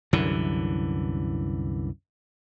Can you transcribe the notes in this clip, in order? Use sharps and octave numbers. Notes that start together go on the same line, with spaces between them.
C2 F#2 D3 E3